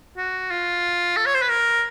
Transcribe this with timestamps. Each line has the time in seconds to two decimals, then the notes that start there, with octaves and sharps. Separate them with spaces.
0.17 F#4
0.51 F4
1.17 A4
1.26 C#5
1.34 C5
1.42 B4
1.50 A#4